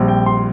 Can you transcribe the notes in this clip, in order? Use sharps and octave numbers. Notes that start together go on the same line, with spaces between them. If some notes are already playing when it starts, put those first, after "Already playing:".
Already playing: A#1 A#2 G3 C4
G5
C6